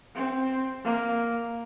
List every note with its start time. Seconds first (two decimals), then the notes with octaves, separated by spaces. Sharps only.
0.15 C4
0.84 A#3